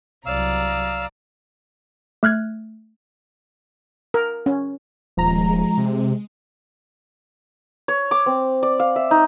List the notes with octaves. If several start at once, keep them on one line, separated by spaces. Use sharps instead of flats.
C2 F#3 D5 F5 A#5 E6
A3 F6 F#6 G#6
A#4
C#4
D#1 F3 G#3 A#5
C3
C#5
D6
C4
D5
F5
E5
D#4